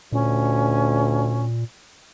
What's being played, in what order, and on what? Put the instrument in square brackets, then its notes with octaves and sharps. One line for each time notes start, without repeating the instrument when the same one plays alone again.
[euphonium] D2 [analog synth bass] A#2 [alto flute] C#4